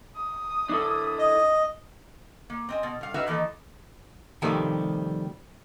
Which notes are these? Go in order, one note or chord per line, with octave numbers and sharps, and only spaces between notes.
D#6
D4 E4 A4
D#5
A#3
C4 D#5 G#5
B2
G2 F5
D#4 E4 F#4 B4 E5 F5
D#3 E3 A#3 A4 D#5
C3 D#3 F3 G3 A3